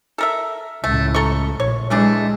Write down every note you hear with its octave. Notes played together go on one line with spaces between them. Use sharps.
A4 A#4 E5
C#2 A2 A3
A4 A#5 C#6
A#1 C#5
E3 G#3 A3 D4